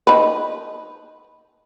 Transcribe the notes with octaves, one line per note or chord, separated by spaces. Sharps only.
D#4 B4